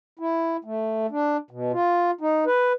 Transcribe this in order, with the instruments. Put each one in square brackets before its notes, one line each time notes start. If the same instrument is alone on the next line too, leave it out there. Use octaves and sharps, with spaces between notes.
[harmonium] E4
A3
D4
B2
F4
D#4
B4